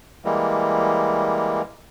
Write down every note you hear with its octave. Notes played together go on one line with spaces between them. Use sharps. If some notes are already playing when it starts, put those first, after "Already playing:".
E3 G3 G#3 A#3